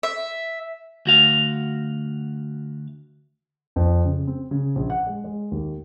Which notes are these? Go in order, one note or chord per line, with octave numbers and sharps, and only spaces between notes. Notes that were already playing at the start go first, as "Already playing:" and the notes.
E5
D2 F#4 F5
F2
C#3
C4
C#3
A#1
F#5
G#3
G#3
D#2